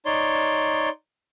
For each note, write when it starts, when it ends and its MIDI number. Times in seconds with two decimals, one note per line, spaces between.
0.06 0.89 63
0.06 0.89 73
0.06 0.89 74
0.06 0.89 84